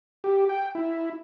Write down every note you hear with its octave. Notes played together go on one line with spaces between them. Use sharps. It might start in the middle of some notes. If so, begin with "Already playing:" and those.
G4
G5
E4